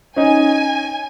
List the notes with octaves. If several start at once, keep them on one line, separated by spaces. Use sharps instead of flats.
C#4 D#4 G#5